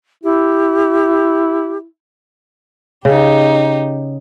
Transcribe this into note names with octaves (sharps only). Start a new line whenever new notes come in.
E4 G4
C#3 D#4 G4